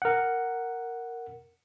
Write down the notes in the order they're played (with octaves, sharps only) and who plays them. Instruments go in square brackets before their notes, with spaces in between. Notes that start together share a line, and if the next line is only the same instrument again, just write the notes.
[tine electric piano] A#4 F#5